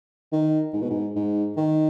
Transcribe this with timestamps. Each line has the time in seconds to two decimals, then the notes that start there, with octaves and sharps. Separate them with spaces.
0.32 D#3
0.73 G#2
0.82 B2
0.90 G#2
1.15 G#2
1.57 D#3